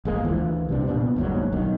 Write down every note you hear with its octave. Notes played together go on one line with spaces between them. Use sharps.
G#1 G#3 A#3
D2 E3 F3
C2 C3 D4
F2 A#2 B3 D4
G1 D#2 G#2 F#3
B1 D#3